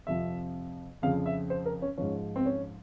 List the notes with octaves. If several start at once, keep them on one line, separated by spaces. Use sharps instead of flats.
F2 C3 F3 E5
F2 C#3 F3 F5
E5
C5
A#4
C#4
G#2 F3 C#4
C4
C#4